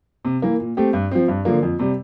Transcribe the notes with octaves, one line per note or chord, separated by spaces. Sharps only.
C3
E3 A#3
A#2
A3 C4 G4
G2
F3 C4
G2
D3 F3 A#3
F2
C3 G3